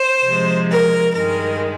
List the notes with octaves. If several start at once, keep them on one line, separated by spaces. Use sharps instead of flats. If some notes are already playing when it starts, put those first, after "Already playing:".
Already playing: C5
C3 F3 G#3
A#4
G2 D#3 G#3 A#4